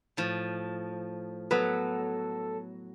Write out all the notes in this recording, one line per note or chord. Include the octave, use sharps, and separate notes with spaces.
A2 F3
F#3 B3 A4 B4